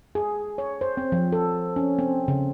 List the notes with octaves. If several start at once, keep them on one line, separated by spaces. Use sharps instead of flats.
G#4
C#5
C5
C4
F3
A4
C#4
C4
C#3